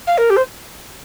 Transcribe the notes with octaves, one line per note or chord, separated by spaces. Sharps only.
F5
A#4
G4
C5